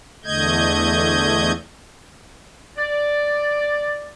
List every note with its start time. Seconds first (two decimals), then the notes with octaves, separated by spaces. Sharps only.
0.25 E2 D3 A3 D#5 G6 G#6
2.77 D5